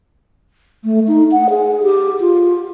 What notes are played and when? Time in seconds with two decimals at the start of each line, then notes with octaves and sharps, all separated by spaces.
0.84 A3
1.08 D#4
1.32 F#5
1.50 G#4
1.83 G4
2.20 F4